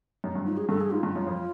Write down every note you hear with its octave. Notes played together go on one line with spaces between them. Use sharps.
F#2
G2
G#2 F4
G#4
G2 A4
G#4
G#2 F4
G2
F#2
F2